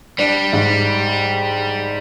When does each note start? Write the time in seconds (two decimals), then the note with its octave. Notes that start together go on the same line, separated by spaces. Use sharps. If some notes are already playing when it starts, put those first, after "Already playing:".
0.18 G3 D4
0.53 G#2